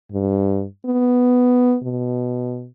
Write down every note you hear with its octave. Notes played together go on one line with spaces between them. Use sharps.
G2
B3
B2